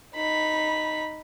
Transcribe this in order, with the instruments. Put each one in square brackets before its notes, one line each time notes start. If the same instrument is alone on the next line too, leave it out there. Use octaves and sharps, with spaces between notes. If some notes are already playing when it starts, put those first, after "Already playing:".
[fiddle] D#4 B5